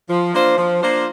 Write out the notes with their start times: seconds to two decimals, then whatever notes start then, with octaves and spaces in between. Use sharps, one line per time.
0.09 F3
0.33 A#3 D4 F4 C5
0.58 F3
0.82 A#3 D4 F4 C5